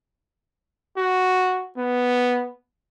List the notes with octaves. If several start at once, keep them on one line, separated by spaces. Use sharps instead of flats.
F#4
B3